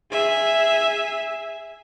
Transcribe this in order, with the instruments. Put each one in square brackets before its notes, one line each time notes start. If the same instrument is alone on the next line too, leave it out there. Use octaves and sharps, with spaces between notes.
[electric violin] G#4 E5